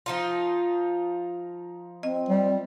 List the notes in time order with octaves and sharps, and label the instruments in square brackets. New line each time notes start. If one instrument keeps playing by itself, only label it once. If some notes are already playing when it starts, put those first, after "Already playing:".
[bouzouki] F3 D#4 F4
[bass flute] C4 [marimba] D#5
[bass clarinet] G3